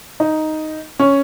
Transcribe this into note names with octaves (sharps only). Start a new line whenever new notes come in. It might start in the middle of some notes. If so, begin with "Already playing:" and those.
D#4
C#4